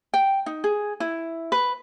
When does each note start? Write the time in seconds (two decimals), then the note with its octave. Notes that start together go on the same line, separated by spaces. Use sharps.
0.14 G5
0.46 D#4
0.64 G#4
1.00 E4
1.52 B4